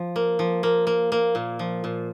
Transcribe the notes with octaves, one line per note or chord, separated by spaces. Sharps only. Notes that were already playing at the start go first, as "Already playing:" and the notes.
Already playing: F3
A#3
F3
A#3
A#3
A#3
A#2
F3
A#2